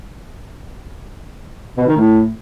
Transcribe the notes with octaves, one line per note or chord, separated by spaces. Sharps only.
B2
D#3
A2